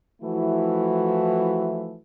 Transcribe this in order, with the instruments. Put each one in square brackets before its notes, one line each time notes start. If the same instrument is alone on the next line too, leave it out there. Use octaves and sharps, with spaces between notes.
[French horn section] E3 F3 A3 E4 F#4